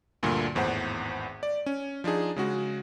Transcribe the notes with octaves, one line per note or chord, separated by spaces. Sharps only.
D2 G2 A#2 D3
G#1 E2 A2 C5 F#5
D5
C#4
F3 D4 D#4 G#4
C#3 G#3 F#4